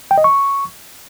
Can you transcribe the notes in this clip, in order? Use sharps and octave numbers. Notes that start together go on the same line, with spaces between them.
G5
D#5
C#6